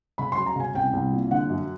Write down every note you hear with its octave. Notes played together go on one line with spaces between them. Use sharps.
C#3 B5
C6
F#3
A#5
C#3 G#5
C2 G5
C2
A#2
D3 F#5
F#2